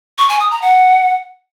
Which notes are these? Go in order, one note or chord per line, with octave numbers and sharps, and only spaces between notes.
C#6
G#5
D#6
A#5
F#5